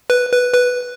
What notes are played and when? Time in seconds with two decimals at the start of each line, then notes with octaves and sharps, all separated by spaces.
0.10 B4
0.32 B4
0.54 B4